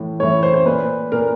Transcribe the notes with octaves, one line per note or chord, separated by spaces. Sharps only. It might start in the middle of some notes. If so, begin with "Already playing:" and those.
Already playing: A2 E3
A2 E3 C#5
C5
C5
A#2 B4
A#2 A#4